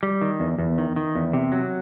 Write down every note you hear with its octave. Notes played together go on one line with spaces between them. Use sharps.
G3
D#3
E2
E2
D#3
D#3
E2
C3
F#3